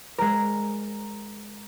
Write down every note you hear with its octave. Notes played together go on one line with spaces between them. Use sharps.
G#3 A#4